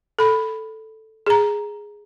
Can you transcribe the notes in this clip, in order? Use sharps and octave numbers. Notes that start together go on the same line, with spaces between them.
A4 B5
G#4 A#5